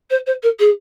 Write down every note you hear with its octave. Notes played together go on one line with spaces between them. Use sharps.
C5
C5
A#4
G#4